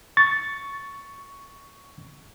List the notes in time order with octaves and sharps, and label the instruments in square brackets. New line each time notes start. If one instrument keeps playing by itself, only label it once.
[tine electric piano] C#6 A6